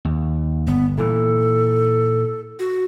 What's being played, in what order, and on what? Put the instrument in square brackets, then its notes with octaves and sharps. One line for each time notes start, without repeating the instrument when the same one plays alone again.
[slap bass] D#2
[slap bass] G1 [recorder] B3
[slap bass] A#2 E3 [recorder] A4
[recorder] F#4